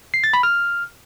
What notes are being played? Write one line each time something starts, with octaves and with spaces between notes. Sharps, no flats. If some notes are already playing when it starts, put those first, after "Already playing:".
C7
A6
B5
F6